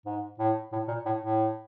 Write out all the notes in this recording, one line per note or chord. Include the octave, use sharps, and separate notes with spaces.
G#2
A2
A2
A#2
A2
A2